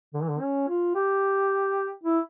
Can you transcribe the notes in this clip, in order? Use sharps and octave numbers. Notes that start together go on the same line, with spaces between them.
D3
E3
D3
C#4
F4
G4
E4